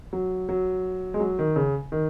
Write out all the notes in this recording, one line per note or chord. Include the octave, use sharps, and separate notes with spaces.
F#3
F#3
G#3
F#3
D#3
C#3
D#3